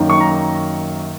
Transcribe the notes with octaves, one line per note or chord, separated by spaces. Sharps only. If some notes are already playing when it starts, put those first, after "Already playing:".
Already playing: F#2 D#3 A#3
C#6
A#5